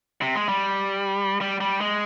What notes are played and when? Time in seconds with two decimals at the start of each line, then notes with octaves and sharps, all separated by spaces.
0.22 C3
0.35 G#3
0.49 G3
1.41 G3
1.60 G3
1.81 G#3